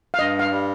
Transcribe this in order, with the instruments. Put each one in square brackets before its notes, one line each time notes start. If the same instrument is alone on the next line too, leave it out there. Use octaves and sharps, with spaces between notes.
[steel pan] F5
[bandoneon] G2 [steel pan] D#5
[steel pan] F5
[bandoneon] G3